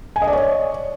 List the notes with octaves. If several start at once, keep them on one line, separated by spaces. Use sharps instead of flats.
G#5
D#5
D5
C#5